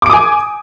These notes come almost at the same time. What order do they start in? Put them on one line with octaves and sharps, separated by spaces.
D6 D7 D#6 G#5